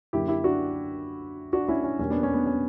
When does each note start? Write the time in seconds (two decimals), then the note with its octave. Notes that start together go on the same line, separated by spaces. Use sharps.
0.13 F#2 D3 F#3 A#3 E4 G4
0.28 E4 G4
0.44 D4 F#4
1.53 D4 F#4
1.68 C#4 E4
1.84 C#4
1.99 E2 B2 G3 A#3 C#4
2.10 B3 D4
2.23 C#4
2.34 B3
2.46 C#4